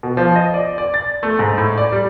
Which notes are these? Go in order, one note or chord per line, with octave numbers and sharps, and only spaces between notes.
B2
F3
D#5
D5
D5
A6
A3
G#2
A2
D5
G3